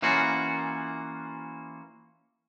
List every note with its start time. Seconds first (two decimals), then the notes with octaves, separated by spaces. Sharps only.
0.02 E3 A#3 C#4 F4 F#4